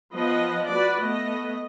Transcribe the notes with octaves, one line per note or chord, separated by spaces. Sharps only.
F3 B3 B4 D#5
F#4 B4 D5
A3 B3 D#5